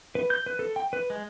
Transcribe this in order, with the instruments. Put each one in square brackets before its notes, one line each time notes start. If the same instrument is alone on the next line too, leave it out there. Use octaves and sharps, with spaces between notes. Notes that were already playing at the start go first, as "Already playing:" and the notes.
[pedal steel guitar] B4
G6
B4
A4
G5
B4
G#3